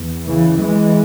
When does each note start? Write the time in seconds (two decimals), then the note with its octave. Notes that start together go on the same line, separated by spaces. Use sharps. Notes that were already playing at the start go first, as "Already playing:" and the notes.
Already playing: E2
0.28 C#3 E3
0.59 E3 G#3